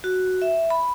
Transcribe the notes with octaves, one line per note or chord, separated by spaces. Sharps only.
F#4
E5
B5